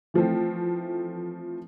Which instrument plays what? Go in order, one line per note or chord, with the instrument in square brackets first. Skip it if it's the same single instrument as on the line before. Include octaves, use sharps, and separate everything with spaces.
[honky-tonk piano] E3 F3 A3 C4